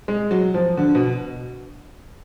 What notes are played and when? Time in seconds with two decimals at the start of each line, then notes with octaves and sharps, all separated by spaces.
0.08 G#3
0.31 F#3
0.54 F3
0.77 D3
0.95 B2